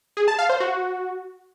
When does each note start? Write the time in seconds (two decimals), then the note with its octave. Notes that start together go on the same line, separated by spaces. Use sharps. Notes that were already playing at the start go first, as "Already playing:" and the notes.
0.17 G#4
0.28 A5
0.39 F5
0.49 C5
0.60 F#4